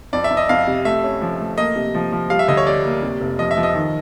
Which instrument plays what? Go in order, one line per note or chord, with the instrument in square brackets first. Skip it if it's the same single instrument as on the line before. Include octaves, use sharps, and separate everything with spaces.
[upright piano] F2 [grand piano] D5
[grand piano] E5
[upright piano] F2
[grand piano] D#5
[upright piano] F2 [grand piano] F5
[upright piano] C3
[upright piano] A3 [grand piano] E5
[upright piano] C#4
F3
A3
[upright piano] A#3 [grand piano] D#5
[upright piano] C3
F3
F3
[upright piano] G3 [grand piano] F5
[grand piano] E5
[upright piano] D2 [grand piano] D#5
[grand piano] C#5
[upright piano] G3 [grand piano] D5
[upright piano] A#3
C3
F1
[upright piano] F3 [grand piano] D#5
[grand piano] E5
[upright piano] F3
[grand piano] D#5
[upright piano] D#3